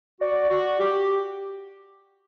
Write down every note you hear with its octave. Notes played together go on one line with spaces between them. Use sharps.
F#4 D5
F#4
G4